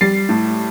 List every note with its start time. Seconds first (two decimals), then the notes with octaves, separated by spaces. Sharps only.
0.01 G3 A6 C7
0.29 A2